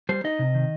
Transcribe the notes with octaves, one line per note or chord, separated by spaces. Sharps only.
G3 C5
D#4 D#5
C3
D#3